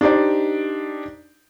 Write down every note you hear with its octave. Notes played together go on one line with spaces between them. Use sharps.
D4 D#4 G4 C5 D5